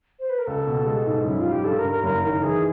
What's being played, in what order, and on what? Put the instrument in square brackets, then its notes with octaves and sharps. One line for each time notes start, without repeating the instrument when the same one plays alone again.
[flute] C5
B4
A#4
[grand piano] C#2 [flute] A4
[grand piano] B2
G#3
G#2
[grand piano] F#2 [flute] E4
[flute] F4
[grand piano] G3
[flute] G4
[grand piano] G2 [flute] A4
[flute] A#4
[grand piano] G2
[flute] A#4
[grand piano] F#1 [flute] A#4
[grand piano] D#3 [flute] A#4
[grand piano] E3 [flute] G#4